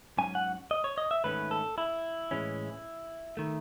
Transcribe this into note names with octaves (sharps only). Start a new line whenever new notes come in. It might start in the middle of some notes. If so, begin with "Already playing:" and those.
G#2 F#3 C#4 G#5
F#5
D#5
C#5
D#5
E5
G#2 D#3 A3 C#4 B4
A4
E4
A2 E3 G#3 C#4
D#3 A3